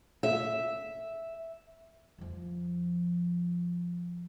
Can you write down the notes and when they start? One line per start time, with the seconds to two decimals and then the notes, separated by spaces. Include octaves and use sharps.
0.23 E5
2.18 F2 F3